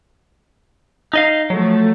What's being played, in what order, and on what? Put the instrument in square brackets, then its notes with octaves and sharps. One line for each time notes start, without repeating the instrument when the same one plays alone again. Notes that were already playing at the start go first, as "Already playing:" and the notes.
[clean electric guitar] D#4 D#5 F5
[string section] F3 A3 [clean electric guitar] F#3